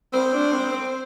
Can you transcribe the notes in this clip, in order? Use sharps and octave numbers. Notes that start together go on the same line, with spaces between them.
C4 C5
D4
C4
C4